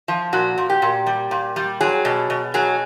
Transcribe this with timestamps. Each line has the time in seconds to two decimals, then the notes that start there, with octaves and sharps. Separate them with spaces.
0.08 F3
0.33 A#2 F#4
0.58 A#2
0.70 G4
0.82 A#2
1.07 G3
1.31 A#2
1.56 G3
1.81 F#3 G#4
2.05 B2
2.30 B2
2.54 F#3 G#4